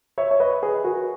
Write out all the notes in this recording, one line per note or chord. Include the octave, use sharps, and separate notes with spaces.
C#5 E5
C#5
B4 D#5
G#4 B4
F#4 A#4